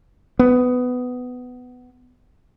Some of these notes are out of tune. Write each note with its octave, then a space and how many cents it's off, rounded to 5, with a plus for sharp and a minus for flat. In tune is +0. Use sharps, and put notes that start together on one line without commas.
B3 +15